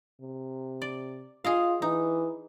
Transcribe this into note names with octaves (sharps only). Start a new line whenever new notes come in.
C3
D5
F4 G#4 D#5 F5
E3 D#4